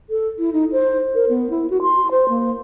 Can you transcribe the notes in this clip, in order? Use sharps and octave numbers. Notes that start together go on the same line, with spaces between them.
A4
E4
D#4
C5
A#4
B3
E4
F#4
C6
C5
A#3